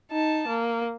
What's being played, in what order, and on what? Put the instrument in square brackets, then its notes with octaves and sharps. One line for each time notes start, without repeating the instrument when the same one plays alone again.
[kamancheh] D#4 A5
A#3